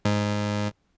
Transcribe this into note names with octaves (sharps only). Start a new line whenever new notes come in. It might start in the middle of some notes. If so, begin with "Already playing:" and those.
G#2